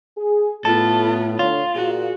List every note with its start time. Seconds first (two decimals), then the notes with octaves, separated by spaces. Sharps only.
0.18 G#4
0.65 A2 B3 F4 A4
1.39 D3 F4 C#5
1.75 A#2 A#3 F#4 G#4